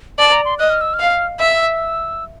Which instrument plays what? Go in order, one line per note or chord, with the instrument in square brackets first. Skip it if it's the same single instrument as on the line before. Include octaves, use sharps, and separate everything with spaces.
[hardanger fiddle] D5 [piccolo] A5
[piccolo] A#5
C6
[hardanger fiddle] D#5 [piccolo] F#6
[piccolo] F6
E6
F6
[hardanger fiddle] F5
[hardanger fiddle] E5 [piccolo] E6